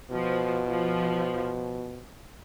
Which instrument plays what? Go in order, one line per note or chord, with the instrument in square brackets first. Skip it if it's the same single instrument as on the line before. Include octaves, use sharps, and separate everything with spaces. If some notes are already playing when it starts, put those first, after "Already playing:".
[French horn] B2 [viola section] F3
[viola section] F3